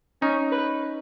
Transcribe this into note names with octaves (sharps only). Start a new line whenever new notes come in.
C#4 D#4
B4